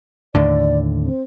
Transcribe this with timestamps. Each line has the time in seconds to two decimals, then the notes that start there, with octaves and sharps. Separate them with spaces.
0.35 D#2 A2 D3 D5
1.03 C4